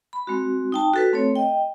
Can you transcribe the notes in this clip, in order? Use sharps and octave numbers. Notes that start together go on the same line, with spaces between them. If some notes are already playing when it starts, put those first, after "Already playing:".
B5
G#3 C4 F#4
D#4 G5 A5
F#4 A4 B4
A3 C4 A4 C#5
D#5 G5